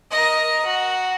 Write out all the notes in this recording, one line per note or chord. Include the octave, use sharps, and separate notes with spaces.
A#4 D#5
F#4